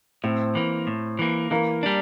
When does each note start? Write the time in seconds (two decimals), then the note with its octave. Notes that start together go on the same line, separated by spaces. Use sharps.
0.24 A2 C4 C5
0.55 E3 A#3
0.87 A2
1.19 E3 A#3
1.51 E3 A#3 A#4
1.83 G3 D4